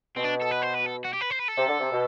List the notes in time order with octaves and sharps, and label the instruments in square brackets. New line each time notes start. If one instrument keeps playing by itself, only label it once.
[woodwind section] B2 [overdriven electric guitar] C4
[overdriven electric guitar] D4
A4
B4
C5
B4
A4
F#4
G4
B4
C5
B4
A4
[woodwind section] C3
D3
C3
B2